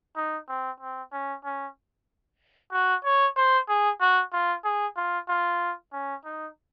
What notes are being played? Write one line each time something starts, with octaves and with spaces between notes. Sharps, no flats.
D#4
C4
C4
C#4
C#4
F#4
C#5
C5
G#4
F#4
F4
G#4
F4
F4
C#4
D#4